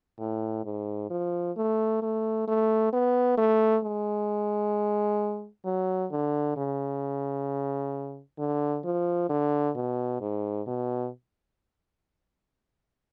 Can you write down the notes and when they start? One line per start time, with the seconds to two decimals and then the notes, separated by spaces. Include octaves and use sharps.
0.19 A2
0.65 G#2
1.10 F3
1.57 A3
2.02 A3
2.48 A3
2.93 B3
3.38 A3
3.84 G#3
5.65 F#3
6.11 D3
6.57 C#3
8.38 D3
8.84 F3
9.29 D3
9.75 B2
10.21 G#2
10.67 B2